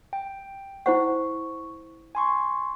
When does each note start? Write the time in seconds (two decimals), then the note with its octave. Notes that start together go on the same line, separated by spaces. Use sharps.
0.13 G5
0.86 E4 C5 F#5 C#6
2.15 G#5 C6 C#6